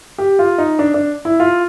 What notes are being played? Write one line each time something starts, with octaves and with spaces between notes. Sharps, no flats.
G4
F4
D#4
D4
D4
E4
F4